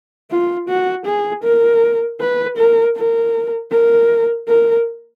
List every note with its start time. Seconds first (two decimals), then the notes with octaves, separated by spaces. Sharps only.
0.30 F4
0.68 F#4
1.06 G#4
1.43 A#4
2.20 B4
2.57 A#4
2.96 A#4
3.71 A#4
4.48 A#4